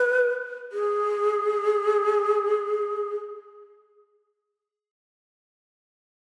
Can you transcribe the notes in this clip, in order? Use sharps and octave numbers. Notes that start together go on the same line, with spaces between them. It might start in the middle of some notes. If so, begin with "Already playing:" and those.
Already playing: B4
G#4